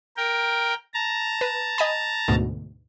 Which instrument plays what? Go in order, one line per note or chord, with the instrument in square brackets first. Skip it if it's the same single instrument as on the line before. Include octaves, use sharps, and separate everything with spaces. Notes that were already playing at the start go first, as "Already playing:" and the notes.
[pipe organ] A#4 G5
A5 A#5
[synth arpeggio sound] B4
D#5 G#5 B5
D2 G#2 B2